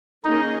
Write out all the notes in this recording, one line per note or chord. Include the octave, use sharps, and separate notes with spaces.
D#3 A#3 C#4 D#4 G#4 D#5